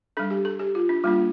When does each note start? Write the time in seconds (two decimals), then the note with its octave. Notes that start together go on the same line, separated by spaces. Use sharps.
0.17 G3 D4 A4
0.30 G4
0.45 A4
0.59 G4
0.75 F4
0.89 D4
1.04 G3 A#3 D4 F4